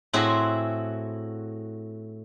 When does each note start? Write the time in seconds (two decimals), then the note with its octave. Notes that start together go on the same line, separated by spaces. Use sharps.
0.13 A2 C4 E4 F#4 G#4